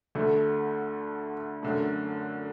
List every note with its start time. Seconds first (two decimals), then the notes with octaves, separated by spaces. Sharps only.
0.15 D2 D3 A3
1.63 F#2 D3 A3